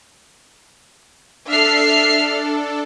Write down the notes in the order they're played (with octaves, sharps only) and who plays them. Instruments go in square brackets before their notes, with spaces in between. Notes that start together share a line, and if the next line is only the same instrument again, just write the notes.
[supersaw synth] D4 A4 [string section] E5 F6 C7